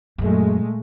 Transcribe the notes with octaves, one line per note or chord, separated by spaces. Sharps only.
F#2 A#2 F#3 G#3 A3